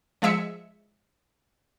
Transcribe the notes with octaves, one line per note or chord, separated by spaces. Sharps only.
F3 G#3 E5 C#7